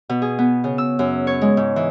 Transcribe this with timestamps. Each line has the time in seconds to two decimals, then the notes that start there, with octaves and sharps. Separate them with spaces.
0.09 B2
0.22 G#4
0.39 B3
0.64 C#3
0.78 E6
0.99 F#2
1.27 C#5
1.41 G#3
1.57 G#2
1.76 E3